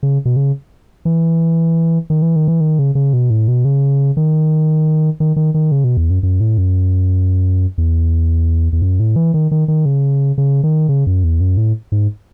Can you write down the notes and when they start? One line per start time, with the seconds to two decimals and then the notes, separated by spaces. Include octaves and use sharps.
0.03 C#3
0.25 B2
0.36 C#3
1.05 E3
2.10 D#3
2.22 E3
2.36 D#3
2.48 E3
2.61 D#3
2.79 C#3
2.95 C#3
3.13 B2
3.30 A2
3.48 B2
3.65 C#3
4.17 D#3
5.20 D#3
5.36 D#3
5.54 D#3
5.72 C#3
5.84 B2
5.97 E2
6.10 F#2
6.23 F#2
6.40 A2
6.58 F#2
7.78 E2
8.73 E2
8.82 F#2
9.00 A2
9.16 E3
9.34 D#3
9.51 D#3
9.68 D#3
9.85 C#3
10.38 C#3
10.64 D#3
10.89 C#3
11.07 F#2
11.24 E2
11.41 F#2
11.57 A2
11.92 G#2